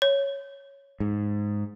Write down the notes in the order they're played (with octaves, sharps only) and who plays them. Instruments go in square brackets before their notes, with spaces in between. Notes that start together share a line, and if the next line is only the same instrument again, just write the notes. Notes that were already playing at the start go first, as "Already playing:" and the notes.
[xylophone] C#5
[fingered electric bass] G#2